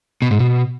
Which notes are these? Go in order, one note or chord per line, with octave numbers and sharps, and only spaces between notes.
B2
G#2
B2